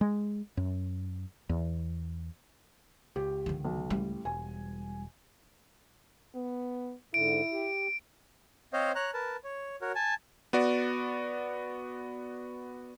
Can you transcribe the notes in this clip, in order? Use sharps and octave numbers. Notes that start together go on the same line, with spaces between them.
G#3
F#2
E2
C#2 G4
D3 D#3
B1
A1 G3
E1 G#5
B3
G#2 D3 E4 D7
G4
C4 C5 C#5 D#5 F5
C#5 A#5 F#6
A#4 B4 A5
C#5
F#4 A#4 C#5
G#5 A5
B3 F#4 D5